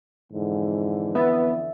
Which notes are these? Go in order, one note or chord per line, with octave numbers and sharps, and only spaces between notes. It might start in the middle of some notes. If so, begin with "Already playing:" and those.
F2 G#2 D3 E3
B3 E5 A6